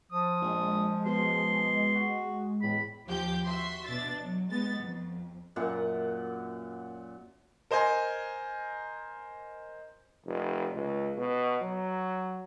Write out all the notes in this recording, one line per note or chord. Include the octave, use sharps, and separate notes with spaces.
F3 D#6
A#1 G#3
B2 C6
F#4
E2 A2 B5
D#2 F3 G4 G6
F#4 E5 C6
B2 D4 A6
F#3
G#3 B3 A6
F2
F#2 A#2 F#5
A#4 C5 D#5 G#5
F1
C#2
B2
F#3